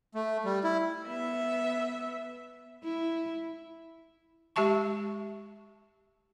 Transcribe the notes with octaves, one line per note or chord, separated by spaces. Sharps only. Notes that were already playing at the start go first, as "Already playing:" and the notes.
A3
G3
E4
B3 E5
E4
G#3 G4 E5 A5 C#6